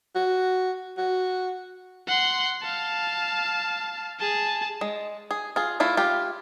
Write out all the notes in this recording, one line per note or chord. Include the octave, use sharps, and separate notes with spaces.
F#4
F#4
F#5 C6
F5 A5
G#4 A5
G#3
G#4
F4 G#4
A3 E4 F4
F4 G4